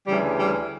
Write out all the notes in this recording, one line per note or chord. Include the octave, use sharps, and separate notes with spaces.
D2 C#3 E3 G3
G3